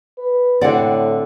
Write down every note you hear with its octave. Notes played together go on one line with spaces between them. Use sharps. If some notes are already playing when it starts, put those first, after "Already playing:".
B4
A2 D3 C4 D5 F#5